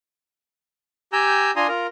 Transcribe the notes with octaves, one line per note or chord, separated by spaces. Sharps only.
G4 G5 G#5 A#5 E6 G6
D4 F4 G#5 A#5 C6 D#6
F4 A#4 A#5